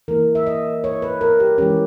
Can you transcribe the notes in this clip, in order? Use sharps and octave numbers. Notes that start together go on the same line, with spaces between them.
E3 A#3 E4 A#4
E5
D#5
C#5
B4
A#4
G4
E3 G#3 C#4 G4